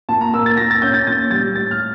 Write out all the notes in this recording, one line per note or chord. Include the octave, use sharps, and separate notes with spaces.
A#2 A5
A#5
A#3 E6
A6
A#2 A#6
A6
C#4 G6
A6
A#2 A6
G3 A6
A2 A6
F6